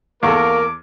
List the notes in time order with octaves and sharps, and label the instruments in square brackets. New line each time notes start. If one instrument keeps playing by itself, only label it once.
[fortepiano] E2 A4 [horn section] A#3 A#4 [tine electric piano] F5 C#6 [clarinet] D6